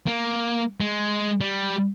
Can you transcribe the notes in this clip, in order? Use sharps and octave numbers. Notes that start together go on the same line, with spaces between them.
A#3
G#3
G3